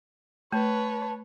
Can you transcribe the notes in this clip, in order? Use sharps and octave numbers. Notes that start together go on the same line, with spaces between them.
A3 B4 C#5 A5